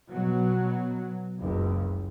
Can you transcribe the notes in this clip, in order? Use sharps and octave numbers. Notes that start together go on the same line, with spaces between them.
B2 F#3
F#1 C#2